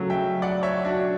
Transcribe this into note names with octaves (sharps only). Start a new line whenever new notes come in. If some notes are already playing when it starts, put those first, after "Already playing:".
Already playing: C#3 F#3 A3
E5 G5
D5 F#5
C#5 E5
D4 F#4